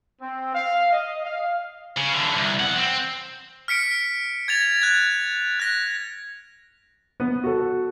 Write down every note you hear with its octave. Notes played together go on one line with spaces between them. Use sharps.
C4
F5
D#5
F5
C#3
D3 E3
C2
E2 F#5
C4
F6 B6 C#7 D7
G#6 A6 F7
F#6 G#6
F#6 A#6
B3
F#4 A4